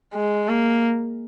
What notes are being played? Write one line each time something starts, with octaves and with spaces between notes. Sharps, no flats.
G#3
A#3